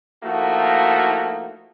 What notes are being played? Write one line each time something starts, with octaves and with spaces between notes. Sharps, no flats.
F3 A3 A#3 D#4 E4 F#4